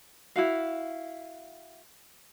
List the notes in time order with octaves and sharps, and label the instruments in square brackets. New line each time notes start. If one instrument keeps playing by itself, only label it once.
[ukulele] E4 F#4 F5